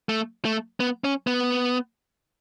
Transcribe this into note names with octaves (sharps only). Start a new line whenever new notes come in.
A3
A3
B3
C#4
B3